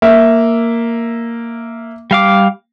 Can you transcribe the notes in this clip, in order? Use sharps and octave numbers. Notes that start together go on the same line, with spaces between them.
A#3 E5
G3 F5 D6